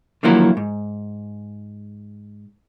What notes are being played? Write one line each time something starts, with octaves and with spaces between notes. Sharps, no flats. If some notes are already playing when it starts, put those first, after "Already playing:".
D3 D#3 F3 F#3 A#3 E4
G#2